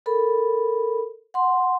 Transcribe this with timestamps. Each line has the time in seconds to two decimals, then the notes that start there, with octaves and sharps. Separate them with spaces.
0.06 A4 A#4 B5
1.34 F#5 C6